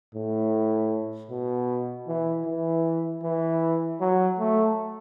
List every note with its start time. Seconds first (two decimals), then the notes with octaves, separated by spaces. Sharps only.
0.14 A2
1.30 B2
2.07 E3
2.46 E3
3.23 E3
4.00 F#3
4.39 A3